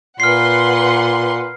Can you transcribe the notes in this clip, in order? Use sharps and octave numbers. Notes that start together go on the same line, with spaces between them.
A#2 B4 F#5 C6 F6 C7